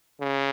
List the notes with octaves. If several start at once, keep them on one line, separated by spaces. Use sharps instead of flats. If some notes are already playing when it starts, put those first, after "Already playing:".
C#3